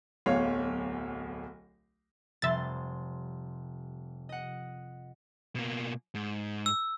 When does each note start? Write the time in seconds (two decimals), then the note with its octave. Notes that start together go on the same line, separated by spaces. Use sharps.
0.26 D1 B1 B2 C#5 F5
2.42 F1 G3 E5 C6 A6
4.29 D#5 F#5
5.55 B2 A#3
6.15 G#2
6.66 E6